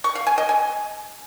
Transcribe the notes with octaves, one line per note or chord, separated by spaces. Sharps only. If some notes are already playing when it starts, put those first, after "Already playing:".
C#6
F5
G#5
D#5
G#5